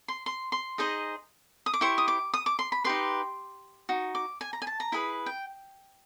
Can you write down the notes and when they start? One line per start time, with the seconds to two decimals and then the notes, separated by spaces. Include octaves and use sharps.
0.08 C6
0.26 C6
0.52 C6
0.78 D#4 G#4 C5 D#5
1.66 D#6
1.74 D6
1.81 E4 G4 C5 C#6
1.98 D#6
2.08 D6
2.34 D#6
2.46 D6
2.59 C6
2.72 B5
2.84 D#4 G4 B4 C6
3.89 D#4 F#4
4.15 D6
4.41 G#5
4.53 A#5
4.62 G#5
4.67 A5
4.80 A#5
4.92 E4 G#4 B4 B5
5.26 G5